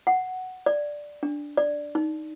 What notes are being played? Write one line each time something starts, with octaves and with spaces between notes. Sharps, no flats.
F#5
D5
D4
D5
D#4